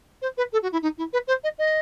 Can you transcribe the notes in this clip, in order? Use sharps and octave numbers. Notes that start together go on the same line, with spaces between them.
C5
B4
A4
F#4
E4
D#4
E4
B4
C5
D#5
D#5